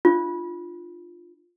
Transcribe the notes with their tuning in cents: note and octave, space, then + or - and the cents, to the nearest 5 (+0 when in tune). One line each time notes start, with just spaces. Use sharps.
D4 +40 F4 +0